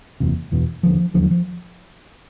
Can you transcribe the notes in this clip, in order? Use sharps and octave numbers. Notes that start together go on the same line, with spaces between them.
F#1 E2 C3
F#1 E2 B2
E1 D#2 D3 F3
E1 D#2 D3 F3
F#3
F3